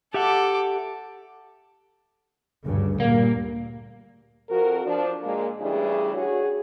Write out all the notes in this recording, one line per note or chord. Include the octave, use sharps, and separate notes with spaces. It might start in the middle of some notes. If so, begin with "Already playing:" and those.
G4 A4 E5 F#5 D6
D2 G2 C#3
A#2 G3 A#3
F2 F#4 A#4
F3 D4
A#2 G#3 A#3
C#3 E3 G3 A3 D4 G#4
F#4 G#4 C#5